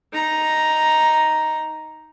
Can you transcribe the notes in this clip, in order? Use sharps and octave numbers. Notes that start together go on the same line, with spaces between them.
D#4 A#5